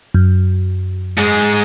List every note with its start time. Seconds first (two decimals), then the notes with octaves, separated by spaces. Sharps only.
0.14 F#2
1.17 G#2 G#3